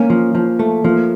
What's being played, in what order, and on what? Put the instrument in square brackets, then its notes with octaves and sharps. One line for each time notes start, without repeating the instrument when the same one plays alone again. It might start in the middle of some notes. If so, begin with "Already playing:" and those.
Already playing: [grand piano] A#3 [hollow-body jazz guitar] C#4
[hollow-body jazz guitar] F3
F3
A3
[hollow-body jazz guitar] F3 [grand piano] A#3